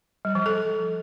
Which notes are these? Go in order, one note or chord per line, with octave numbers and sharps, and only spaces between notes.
G3
F3
A4